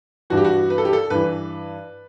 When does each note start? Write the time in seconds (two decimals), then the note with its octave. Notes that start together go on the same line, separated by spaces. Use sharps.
0.30 G2 E3 F#4
0.37 G4
0.45 F#4
0.70 B4
0.78 A4
0.85 G4
0.93 A4
1.10 G2 E3 B4